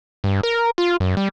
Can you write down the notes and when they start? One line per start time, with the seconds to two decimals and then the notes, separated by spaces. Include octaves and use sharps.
0.24 G2
0.43 A#4
0.78 F4
1.00 F#2
1.17 G3